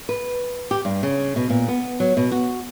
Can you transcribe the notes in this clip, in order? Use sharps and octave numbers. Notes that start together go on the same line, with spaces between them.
B4
G4
G2
C#3
B2
A#2
B3
F#3
B2
F#4